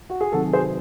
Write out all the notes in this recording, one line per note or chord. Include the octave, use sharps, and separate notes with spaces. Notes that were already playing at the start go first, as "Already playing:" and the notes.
F#4
G#4
C3 D#3 F#3 F#4 A4
G#4 C5